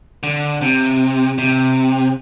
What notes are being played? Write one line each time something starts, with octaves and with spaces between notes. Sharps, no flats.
D3
C3
C3